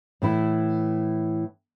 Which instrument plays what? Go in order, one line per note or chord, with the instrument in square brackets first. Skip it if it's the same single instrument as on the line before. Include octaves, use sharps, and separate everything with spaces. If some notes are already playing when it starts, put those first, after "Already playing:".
[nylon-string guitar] A2 E3 E4